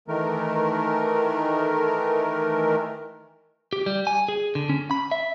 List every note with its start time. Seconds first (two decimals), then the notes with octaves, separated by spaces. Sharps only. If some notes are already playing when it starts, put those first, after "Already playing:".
0.08 D#3 E3 A3 A#4
3.73 G4
3.86 G3
4.07 G#5
4.28 G#4
4.55 D3
4.69 C#4
4.91 B5
5.11 E5